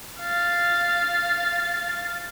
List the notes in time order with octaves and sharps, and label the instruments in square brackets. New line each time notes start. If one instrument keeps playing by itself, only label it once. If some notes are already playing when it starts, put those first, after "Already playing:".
[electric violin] F5 A6